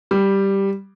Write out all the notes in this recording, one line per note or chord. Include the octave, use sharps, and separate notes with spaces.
G3